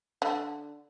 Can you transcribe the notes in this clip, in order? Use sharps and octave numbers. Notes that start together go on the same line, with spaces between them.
D3